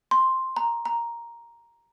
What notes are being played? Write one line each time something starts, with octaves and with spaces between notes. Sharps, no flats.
C6
A#5
A#5